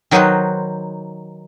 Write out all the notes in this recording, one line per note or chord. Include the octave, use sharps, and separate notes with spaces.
D#3 F#3 D#4 F#4 B4 C5